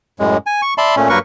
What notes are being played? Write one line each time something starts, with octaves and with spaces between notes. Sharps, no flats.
F#2 A2 G#3
G#5
C#6
D5 E5 A5 B5 C6
A#2 A3 C#4
G2 F#3 A#3 A#4 B4 C#6